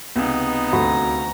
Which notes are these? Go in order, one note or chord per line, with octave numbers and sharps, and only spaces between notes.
C#2 C3 B3 D#4
D2 F#4 A#5 B5